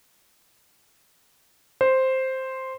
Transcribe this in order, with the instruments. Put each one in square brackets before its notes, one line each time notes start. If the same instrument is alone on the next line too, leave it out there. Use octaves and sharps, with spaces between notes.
[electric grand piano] C5